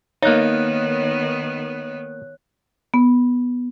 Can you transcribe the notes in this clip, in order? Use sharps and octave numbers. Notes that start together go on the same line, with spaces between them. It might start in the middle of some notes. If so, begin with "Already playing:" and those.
D#3 A#3 B3 D#4 C#5 F#6
B3